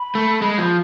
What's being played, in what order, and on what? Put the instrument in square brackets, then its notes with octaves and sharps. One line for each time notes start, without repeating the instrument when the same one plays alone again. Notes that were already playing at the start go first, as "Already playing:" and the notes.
Already playing: [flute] B5
[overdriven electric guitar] A3
G#3
F3